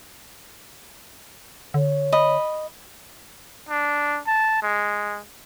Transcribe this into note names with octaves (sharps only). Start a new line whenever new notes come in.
D3 C#5
D#5 B5
D4
A5
G#3